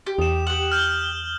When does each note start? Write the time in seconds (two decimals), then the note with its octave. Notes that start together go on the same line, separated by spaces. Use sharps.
0.07 G4
0.18 E2 D#6 E7
0.47 G4 F#5 F#7
0.72 F6 G6 G7